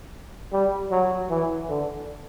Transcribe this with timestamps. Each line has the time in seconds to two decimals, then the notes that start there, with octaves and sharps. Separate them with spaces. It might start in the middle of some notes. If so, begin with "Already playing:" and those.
0.52 G3
0.91 F#3
1.30 E3
1.69 D3